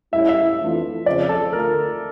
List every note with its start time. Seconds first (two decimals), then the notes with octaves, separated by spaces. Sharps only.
0.13 A2 G3 C#4 E4 E5
0.29 E5
0.59 F2 E3 A3 D4 F4
1.06 F2 C#3 F3 D5
1.29 A4
1.53 D3 A3 D4 F4 A#4